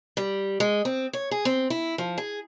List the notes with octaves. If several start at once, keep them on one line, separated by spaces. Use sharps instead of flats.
G3
G#3
C4
C#5
G#4
C4
E4
F3
G#4